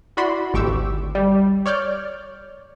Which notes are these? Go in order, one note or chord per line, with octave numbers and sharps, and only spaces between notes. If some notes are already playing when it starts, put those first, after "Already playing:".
E4 F#4 D5 B5 C6
G#1 D2 G4 C#6 D6 E6
G3
C#5 D5 F6 G6